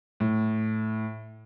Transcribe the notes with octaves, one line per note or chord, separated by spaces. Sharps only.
A2